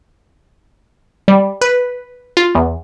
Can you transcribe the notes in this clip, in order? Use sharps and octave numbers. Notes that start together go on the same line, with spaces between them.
G3
B4
F4
E2